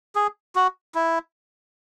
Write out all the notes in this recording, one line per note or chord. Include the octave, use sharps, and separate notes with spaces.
G#4
F#4
E4